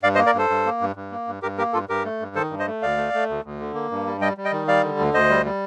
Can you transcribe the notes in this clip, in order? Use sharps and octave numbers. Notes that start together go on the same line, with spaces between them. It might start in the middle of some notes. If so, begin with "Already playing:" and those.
G2 D5 F5
C5 D#5
A#3
A#4 D5
G2 A4 C5
G2
A#3
G2
G2
A#3
G2
G2 G4 A#4
A#3 G4 A#4
G2 F4 A4
G2 G4 A#4
A3
G2
D#3 A4 C5
G2
C5 D#5
A3
D2 D5 F5
A3
A3
D2
D2
D3
A#3
G2
G3
G3 D#5 G5
G3
D#5 G5
D#3
G3 D5 F5
D3
D2
D2 C5 D#5
G3
G3